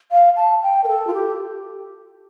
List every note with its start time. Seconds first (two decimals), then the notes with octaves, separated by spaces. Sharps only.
0.11 F5
0.36 A5
0.63 G5
0.84 A#4
0.88 A4
1.07 F4
1.14 G4